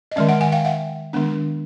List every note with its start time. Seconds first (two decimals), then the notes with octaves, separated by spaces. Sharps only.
0.12 D#5
0.16 D#3 G#3 C#4 D5 E5
0.29 E5 F#5
0.41 F#5 G#5
0.52 F5 G5
0.65 E5 F#5
1.13 D#3 G#3 B3 D4